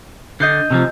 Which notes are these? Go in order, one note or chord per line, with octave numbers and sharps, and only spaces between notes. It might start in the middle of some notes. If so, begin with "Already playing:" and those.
D3 D#5 G6 C7
C3 E3 F3